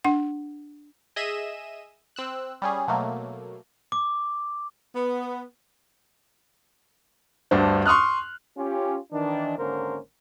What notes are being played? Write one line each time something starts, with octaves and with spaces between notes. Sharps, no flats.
D4 F#5
G#4 D#5 E5 D#7 E7
C4 E6 F#6
G3 C#4 G#4
B2 F#3 A3 A#3
D6
B3
D2 G2 D4 C5
C6 C#6 D#6 F6 F#6
C#4 F4 G4
D#3 E3 D4
G#1 D3 A#3 C#4 A#4 C5